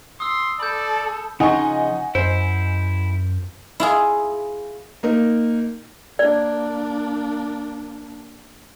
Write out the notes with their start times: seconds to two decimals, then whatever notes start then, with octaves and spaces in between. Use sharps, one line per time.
0.20 C6 D#6 E6
0.60 A4 D5 B5 G6
1.40 C#3 F3 D#4 D#5 F#5 G#5 C#6
2.15 F#2 E4 C5
3.80 E4 F4 G#4
5.03 A#3 D#4 A#4
6.19 A#3 D4 D5